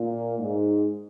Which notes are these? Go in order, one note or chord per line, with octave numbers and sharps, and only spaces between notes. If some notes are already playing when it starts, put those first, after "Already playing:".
Already playing: A#2
G#2